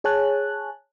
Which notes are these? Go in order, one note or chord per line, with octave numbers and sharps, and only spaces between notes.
G#4 C#5 G#5 A5 F#6